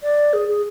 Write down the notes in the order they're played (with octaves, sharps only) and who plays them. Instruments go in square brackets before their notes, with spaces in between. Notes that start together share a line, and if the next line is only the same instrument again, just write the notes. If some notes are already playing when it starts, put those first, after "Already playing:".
[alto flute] D5
G#4
G#4